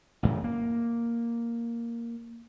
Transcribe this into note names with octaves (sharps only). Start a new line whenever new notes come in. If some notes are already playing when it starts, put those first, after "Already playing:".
A1 F#2 C#3
A#3